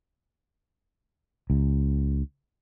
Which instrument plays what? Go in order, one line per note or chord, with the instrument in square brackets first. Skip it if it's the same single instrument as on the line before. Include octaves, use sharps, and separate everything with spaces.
[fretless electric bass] C#2